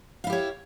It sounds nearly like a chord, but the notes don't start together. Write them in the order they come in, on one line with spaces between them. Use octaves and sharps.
F5 E4 G4 C#5